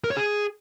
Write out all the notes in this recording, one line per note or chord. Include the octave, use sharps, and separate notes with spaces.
A#4
C#5
G#4